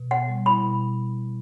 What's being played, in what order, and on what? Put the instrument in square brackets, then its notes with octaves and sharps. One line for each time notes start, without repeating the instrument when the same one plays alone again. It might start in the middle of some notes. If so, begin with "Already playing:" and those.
Already playing: [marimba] B2
[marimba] B3 [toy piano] F#5
[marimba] G3
[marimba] E4 [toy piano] B5
[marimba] B2